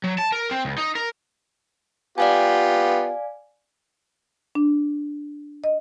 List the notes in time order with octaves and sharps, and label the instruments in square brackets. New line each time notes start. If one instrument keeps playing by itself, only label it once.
[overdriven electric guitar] F#3
A5
A#4
C4
C#2
D#4
A#4
[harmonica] B3 F4 G4 [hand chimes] D5 F5 G#5
[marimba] D4
D#5